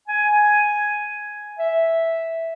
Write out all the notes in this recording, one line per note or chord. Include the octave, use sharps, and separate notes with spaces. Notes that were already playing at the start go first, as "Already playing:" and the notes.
G#5
E5